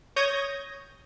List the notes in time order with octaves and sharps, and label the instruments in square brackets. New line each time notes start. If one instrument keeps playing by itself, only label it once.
[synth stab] C#5 D#6 G6 G#6 A#6